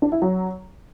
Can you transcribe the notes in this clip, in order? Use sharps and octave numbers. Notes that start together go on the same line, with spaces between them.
D4
E4
F#3